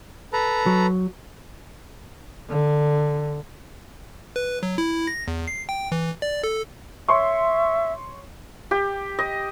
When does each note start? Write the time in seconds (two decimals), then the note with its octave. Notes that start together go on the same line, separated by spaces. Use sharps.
0.33 A4 B4 A#5
0.66 F#3
2.50 D3
4.36 B4
4.63 F#3
4.78 E4
5.07 A#6
5.28 E2
5.48 C7
5.69 G5
5.92 E3
6.22 D5
6.44 A4
7.08 C#5 E5 C6 C#6
8.71 G4
9.19 D#5